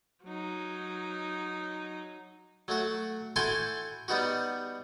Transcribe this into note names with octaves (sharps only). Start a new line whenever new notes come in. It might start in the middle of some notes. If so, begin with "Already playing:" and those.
F#3 D#4
F#3 A3 F#4
E4 F#4 A4 G5 G#5 C6
G3 B3 D#4 F#4